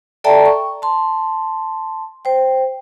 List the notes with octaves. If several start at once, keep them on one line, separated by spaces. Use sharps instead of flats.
A4 D5 E5 G5 A5 A#5
C#6
A5 C6
C5 G5